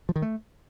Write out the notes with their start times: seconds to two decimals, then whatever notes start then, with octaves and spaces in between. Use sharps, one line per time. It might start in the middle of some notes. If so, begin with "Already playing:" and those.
0.09 F3
0.16 D#3
0.22 A3